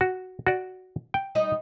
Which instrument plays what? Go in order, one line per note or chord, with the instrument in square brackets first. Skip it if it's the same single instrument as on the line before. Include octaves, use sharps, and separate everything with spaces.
[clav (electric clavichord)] F#4
F#4 D5
G5
[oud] G3 D#4 D#5